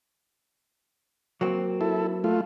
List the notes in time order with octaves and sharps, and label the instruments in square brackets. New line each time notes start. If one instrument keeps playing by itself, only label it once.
[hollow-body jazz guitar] F#3 A#3 C4
[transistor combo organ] E4 A4
A3 F4